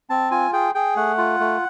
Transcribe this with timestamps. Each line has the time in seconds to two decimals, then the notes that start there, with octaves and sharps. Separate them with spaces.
0.10 C4 A5
0.31 F4 G#5
0.53 G#4 G5
0.75 G#4 G5
0.96 A3 F#5
1.18 F4
1.40 A3